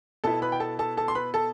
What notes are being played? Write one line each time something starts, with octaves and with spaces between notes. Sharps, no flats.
B2 B3 E4 A4 A5
B4 B5
G5
A4 A5
A4 A5
A4 A5
C6
B4 B5
A4 A5